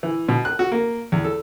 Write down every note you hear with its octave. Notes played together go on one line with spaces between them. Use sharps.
E3
B2
F#6
F#4
A#3
E2
A4